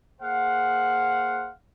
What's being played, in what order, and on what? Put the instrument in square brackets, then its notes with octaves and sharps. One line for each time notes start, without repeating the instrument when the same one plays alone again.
[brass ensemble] A#3 G#4 C5 F5 F#5